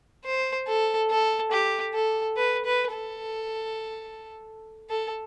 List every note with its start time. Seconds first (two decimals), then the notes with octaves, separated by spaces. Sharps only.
0.25 C5
0.67 A4
1.10 A4
1.52 G4
1.94 A4
2.37 B4
2.65 B4
2.93 A4
4.90 A4